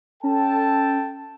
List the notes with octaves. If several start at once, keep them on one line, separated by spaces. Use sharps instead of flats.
C#4 A4 G5 A5